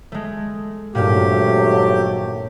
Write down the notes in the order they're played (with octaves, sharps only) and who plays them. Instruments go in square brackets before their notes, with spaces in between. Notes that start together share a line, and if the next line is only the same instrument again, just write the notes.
[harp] G#3 A3
[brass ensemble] G#1 F#3 A3 [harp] G2 A#2 [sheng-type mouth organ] G4